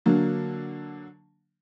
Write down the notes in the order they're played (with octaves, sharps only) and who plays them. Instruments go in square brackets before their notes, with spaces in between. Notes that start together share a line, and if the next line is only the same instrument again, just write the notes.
[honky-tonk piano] D3 F#3 A#3